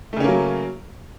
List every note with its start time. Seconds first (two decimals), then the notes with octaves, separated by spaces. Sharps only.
0.13 A3
0.17 C#3
0.20 C#4
0.24 A#3
0.28 F#3